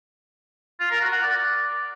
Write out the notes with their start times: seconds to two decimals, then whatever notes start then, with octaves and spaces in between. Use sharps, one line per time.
0.80 F4
0.91 A#4
1.01 F#4
1.12 F#5
1.23 D5